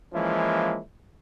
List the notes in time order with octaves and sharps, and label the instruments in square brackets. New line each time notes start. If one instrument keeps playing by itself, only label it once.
[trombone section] E3 F3 G#3 A#3 C#4 E4